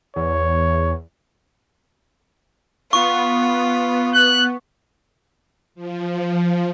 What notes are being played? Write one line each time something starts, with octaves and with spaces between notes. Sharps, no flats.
E2 C#5
B3 F4 C#6
F#6
F3